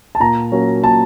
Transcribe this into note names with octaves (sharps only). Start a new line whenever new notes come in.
A5
A#2 A#5
F#3 A#3 C#4
A#2 A5